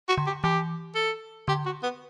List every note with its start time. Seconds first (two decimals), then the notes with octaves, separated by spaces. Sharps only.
0.09 F#4
0.18 D3
0.27 G4
0.44 E3 G4
0.95 A4
1.48 D3 G4
1.66 F#4
1.83 B3